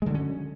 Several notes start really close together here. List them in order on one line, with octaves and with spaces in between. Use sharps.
G#3 D3 F#3 C#4